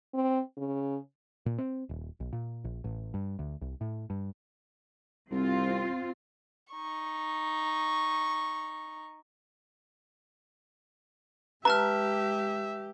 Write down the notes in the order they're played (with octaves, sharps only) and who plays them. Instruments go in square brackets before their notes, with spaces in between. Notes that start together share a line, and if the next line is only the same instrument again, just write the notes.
[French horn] C4
C#3
[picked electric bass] A#2
C4
D#1
B1
A#2
A#1
A1
G2
D2
C2
A2
G2
[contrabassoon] C2 [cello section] C4 F4
[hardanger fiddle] D#4 C#6
[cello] G#3 G4 [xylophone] B4 A5 F6 [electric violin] E5 [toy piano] A#5